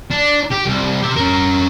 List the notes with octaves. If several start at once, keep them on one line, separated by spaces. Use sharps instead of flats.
D4
G4
C2
G4 E5
C#4 A#4